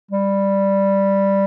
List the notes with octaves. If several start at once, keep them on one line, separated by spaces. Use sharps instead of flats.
G3